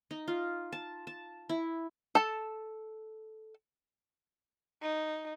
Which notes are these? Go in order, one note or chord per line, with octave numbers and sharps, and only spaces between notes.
D#4
F4
A5
A5
E4
A4 A5
D#4